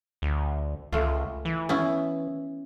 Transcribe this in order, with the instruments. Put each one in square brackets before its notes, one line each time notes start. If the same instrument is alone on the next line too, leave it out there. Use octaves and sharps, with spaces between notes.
[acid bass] D2
[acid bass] C#2 [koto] A3 F4
[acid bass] E3
[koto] B3 C#4 E4